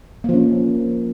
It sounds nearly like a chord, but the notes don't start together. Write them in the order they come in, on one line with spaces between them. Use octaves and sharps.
A#3 F3 C#4